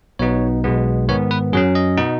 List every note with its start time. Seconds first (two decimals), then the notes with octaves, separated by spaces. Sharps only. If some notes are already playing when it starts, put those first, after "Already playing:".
0.19 B1 B2 B3 D#4 C#5
0.64 B1 B2 G#3 B3
1.09 G#2 D#3 B3 C#5
1.31 B4
1.53 F#2 F#3 C#4 G#4
1.75 D#5
1.97 B2 B3 D#4